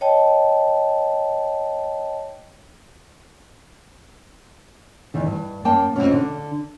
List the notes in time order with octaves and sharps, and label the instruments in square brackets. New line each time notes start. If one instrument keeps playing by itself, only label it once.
[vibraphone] C#5 D#5 G5 A5
[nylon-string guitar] E2 D#3 E3
G2
F#2 A#3 A#4 G5 A5
F2 G#2 B2 C#4
D3 D4